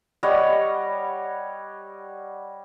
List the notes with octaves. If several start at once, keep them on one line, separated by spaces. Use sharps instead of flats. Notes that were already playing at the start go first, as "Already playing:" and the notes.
G3 C#5 D#5 F#5